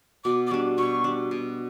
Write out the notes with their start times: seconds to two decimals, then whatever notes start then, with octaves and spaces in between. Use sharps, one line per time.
0.24 B2 D6
0.47 D6
0.51 G3 D4 C#6
0.78 B2 C#6
1.04 G3 D4
1.31 B2